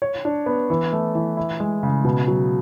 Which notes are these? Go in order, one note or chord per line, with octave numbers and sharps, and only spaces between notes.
C#5
D4
B3
E3
A3
E3
E4
G#3
C#3
B2
F#3